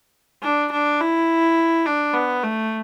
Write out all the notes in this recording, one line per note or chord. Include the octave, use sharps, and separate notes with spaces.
D4
D4
E4
D4
B3
A3